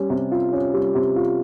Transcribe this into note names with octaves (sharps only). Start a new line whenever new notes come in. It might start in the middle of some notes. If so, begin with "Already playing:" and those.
Already playing: G3 C#4
C3
F4
C#4
G3
C3
F4